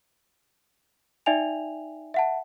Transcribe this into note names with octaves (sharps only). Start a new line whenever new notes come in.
D#4 D5 E5 G5 G#5 F7
E5 F#5 A5